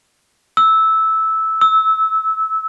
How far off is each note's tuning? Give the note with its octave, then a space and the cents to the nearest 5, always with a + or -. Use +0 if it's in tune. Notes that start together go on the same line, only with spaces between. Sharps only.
E6 -10
E6 -20